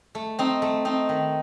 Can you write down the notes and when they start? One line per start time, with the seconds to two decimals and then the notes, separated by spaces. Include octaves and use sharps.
0.15 A3
0.39 C4 D#4
0.62 A3
0.85 C4 D#4
1.09 D#3